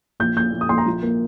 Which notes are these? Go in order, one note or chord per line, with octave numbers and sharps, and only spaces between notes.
A#1 G6
A#1 G6
A#1
D#6
A#1 C6
A#5
F3
A#3